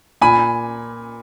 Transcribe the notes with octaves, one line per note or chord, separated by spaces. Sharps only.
A#2 G#5 B5